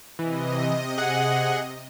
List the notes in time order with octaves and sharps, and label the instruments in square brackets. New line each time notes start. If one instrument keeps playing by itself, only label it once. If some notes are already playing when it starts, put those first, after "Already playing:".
[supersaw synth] C3 D#5 [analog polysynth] E3
[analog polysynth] G#4 F#5